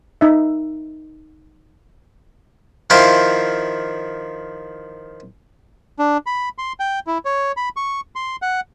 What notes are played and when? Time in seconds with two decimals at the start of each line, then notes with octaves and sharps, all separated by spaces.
0.21 D#4 E5
2.90 D#3 F3 E4 F5 G5 C6
5.99 D4
6.26 B5
6.58 C6
6.80 G5
7.07 E4
7.25 C#5
7.57 B5
7.77 C#6
8.16 C6
8.42 F#5